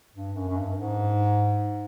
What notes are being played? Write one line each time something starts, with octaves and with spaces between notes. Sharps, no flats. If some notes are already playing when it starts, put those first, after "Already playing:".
G2
F#2
F#2
G2
G#2